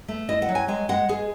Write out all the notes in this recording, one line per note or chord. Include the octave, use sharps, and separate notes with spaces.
A3
E4 D#5
F#5
F#3
G#5
G#3 G#5
G#3 F#5
G#3 G#4